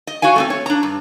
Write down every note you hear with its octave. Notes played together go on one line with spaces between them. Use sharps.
D#5
F#4 C#5 F5 G#5
A3 B3 C4
C#5
D4 A#5
G2